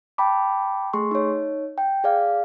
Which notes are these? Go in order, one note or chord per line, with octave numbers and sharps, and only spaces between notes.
G5 A5 B5 D6
A3 G#4 C6 C#6
D#4 C#5
G5
G#4 D5 F5